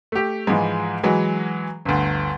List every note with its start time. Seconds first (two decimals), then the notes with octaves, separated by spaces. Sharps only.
0.12 A3 G4
0.47 G#2 E3 F3 G#3
1.03 E3 F#3 G#3
1.85 G1 D2